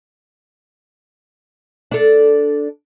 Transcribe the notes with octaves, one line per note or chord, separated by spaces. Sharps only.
D4 A4